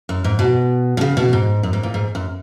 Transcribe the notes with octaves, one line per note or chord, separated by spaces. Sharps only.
F#2
G#2
B2
B2
C#3
B2
G#2
F#2
G#2
A#2
G#2
F#2